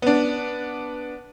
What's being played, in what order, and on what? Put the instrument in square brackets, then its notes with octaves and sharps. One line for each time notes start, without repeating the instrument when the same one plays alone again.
[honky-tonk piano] B3 D4